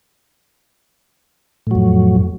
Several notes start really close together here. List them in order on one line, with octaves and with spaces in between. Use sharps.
A2 F#3 F2